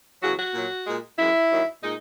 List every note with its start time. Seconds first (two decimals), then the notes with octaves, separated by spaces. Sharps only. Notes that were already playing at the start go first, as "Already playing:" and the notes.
0.22 E2 C#3 F#3 F#4
0.38 F#4
0.54 A#2 F#3
0.86 A#2 G#3
1.18 F#2 E3 G#3 E4
1.50 D#2 D#3 F#3
1.82 A#2 G#3 D#4